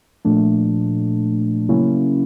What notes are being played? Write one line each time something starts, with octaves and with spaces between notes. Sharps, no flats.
A#2 F3 A3 D4
C#3 F#3 A#3 C#4 E4